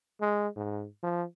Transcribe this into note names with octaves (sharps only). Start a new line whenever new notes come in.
G#3
G#2
F3